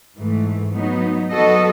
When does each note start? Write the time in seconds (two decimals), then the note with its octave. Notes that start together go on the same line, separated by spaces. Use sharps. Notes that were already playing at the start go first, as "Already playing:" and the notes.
0.18 G#2 E3 A3
0.75 F#3 B3 D#4
1.31 F#3 B3 F#4 A4 D#5